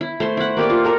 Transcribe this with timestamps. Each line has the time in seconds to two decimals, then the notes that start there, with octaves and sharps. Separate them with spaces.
0.01 E4
0.20 A3 C5 C6
0.37 E4 F#5
0.57 A#3 G4 D5
0.70 F4
0.84 F#4 A4 A#4